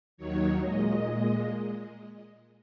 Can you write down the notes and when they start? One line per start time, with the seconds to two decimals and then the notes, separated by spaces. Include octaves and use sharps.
0.17 D#2 D#3 F#3 C#5
0.60 A#2 G#3 D#5
1.02 A#2 G#3